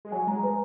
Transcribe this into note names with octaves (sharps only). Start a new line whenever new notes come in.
G#3
F#3 G#5
G#3 A#5
B4